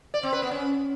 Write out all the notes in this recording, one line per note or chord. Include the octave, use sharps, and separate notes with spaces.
D5
C4
B4
B3
C#4